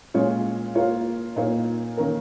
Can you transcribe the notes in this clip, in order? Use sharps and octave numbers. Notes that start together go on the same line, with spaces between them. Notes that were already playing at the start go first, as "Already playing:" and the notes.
A#2 G#3 C#4 F4 C#5
A#3 F4 C#5
A#2 A#3 D#4 C#5
D#3 A#3 C#4 A#4